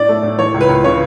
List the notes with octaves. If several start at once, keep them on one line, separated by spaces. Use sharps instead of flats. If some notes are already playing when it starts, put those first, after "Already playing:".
Already playing: A2 D4 D5
A3
A2
E3 C#5
C#2
B4
C#2
C#3 C#5